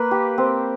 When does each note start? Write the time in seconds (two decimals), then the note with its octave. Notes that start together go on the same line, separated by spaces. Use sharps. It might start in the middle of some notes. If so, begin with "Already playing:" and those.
Already playing: A#3 B4
0.11 G4
0.38 C4